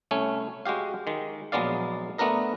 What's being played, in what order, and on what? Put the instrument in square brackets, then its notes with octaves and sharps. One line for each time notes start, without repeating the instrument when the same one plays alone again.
[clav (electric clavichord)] C2 A3 C#4 G#5
G#3 F#4 G4 F5
D#3 G#3
A#1 F#3 G#3 B3 D5 F5
A3 B3 D4 A#4 D#5